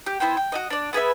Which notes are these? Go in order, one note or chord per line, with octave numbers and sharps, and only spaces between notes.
G4
B3 E4 C5 G5
G5
F#4 A4 D#5
D4 D5
B3 G#4 B4 E5